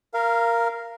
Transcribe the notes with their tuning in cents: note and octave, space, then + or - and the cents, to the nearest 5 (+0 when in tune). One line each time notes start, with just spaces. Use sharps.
A#4 +0 F5 -20